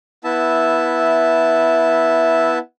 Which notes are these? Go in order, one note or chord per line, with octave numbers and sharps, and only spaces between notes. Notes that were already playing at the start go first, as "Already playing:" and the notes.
B3 E4 E5 A5